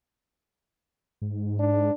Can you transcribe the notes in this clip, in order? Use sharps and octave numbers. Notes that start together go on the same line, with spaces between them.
G#2
D4